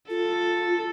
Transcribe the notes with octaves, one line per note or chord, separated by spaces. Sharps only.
F4 A4